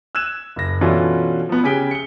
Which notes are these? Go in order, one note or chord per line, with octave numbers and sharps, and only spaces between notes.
E6 F#6 G#6 E7
F#1 A#6
B2 E3 C#4 D4 F4 A4
F3 B3
C#3 G4 G#5 B6 D7 G7
C#7 G7